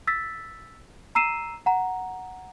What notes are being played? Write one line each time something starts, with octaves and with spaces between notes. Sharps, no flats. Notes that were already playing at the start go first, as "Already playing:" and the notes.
E6 A6 B6
A#5 E6 C7 D#7 E7
F#5 A#5